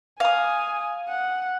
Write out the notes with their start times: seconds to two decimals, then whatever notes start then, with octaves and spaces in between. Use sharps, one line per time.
0.20 F5 G#5 D#6
1.09 F#5